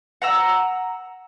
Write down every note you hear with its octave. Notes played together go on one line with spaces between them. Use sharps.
F#5 A#5 E6